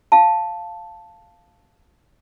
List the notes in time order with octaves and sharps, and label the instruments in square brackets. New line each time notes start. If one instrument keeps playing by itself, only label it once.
[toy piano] F5 A5